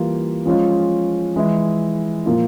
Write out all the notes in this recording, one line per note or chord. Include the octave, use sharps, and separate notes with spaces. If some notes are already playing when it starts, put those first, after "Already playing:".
Already playing: E3 G3 A#3 F4
F3 G#3 C#4 F4
E3 G#3 E4
A#2 F3 A#3 F4